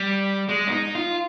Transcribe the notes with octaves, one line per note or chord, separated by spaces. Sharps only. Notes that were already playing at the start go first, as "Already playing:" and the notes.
Already playing: G3
G#3
D4
D#4
F4